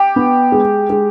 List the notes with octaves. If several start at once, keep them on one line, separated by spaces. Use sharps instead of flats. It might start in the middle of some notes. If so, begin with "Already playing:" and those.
Already playing: G4
B3
G#3
G#3